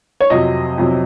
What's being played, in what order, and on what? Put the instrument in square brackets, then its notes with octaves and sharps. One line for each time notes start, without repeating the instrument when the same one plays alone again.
[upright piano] C#5
F2 C3 F#3 D#5
F2 C3 F#3